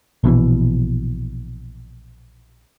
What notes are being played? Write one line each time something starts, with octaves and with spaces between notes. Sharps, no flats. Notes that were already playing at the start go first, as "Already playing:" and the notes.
A#1 B2 D3 E3